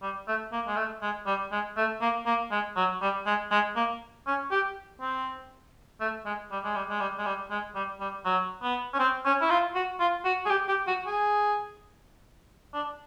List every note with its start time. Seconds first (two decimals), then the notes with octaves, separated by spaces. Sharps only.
0.02 G3
0.27 A3
0.52 A#3
0.67 G#3
0.76 A3
1.02 G#3
1.26 G3
1.52 G#3
1.77 A3
2.02 A#3
2.26 A#3
2.51 G#3
2.76 F#3
3.02 G3
3.26 G#3
3.51 G#3
3.76 A#3
4.27 C#4
4.51 G4
5.01 C4
6.01 A3
6.25 G#3
6.51 G3
6.64 G#3
6.75 G3
6.90 G#3
7.00 G3
7.19 G#3
7.26 G3
7.51 G#3
7.75 G3
8.00 G3
8.25 F#3
8.63 B3
8.94 C#4
8.99 C4
9.25 C#4
9.41 E4
9.50 F4
9.75 F#4
10.00 F4
10.25 F#4
10.45 G#4
10.50 G4
10.68 G4
10.87 F#4
11.06 G#4
12.74 D4